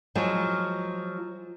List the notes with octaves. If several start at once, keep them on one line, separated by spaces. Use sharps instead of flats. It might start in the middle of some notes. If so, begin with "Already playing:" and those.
F3 F#3 G#3